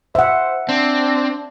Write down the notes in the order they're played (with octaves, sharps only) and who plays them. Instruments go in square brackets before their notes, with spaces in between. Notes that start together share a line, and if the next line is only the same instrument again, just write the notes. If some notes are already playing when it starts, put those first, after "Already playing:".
[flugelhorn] C5 [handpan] E5 F#5
[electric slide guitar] C4 [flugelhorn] D4